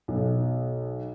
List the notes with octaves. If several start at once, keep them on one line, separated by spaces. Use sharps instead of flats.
B1